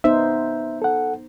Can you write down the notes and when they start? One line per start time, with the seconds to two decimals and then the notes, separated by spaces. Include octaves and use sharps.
0.04 B3 D#4 C5 E5
0.82 A4 F#5